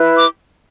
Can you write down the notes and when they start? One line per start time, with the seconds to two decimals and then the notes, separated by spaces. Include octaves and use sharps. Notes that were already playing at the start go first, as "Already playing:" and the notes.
Already playing: E4 B4
0.18 D6